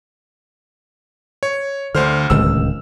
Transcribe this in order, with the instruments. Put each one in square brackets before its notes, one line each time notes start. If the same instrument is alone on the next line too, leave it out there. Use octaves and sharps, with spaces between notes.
[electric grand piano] C#5
[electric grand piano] D2 C5 F6 [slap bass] D3
[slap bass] D1 C#2 D#3 [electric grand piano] E6